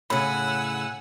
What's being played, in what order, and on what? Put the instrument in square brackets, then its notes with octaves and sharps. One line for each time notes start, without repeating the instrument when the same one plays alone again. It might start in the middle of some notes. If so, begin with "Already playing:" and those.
[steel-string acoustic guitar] A2 C#3 [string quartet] F#5 G#5 E6 [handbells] B5